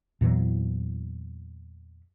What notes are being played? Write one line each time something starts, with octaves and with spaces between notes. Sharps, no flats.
E2 A#2 E3 F#3